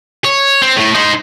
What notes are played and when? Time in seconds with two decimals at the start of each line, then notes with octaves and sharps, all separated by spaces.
0.25 C#5
0.62 C4
0.77 A2 A3
0.95 D#4 C5